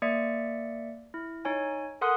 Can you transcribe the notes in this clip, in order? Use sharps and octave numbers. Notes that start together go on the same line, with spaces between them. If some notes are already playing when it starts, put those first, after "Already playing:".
A#3 D5 E5 C#7
E4
D#4 C#5 G#5
A4 A#4 F#5 C6 D#6 F#6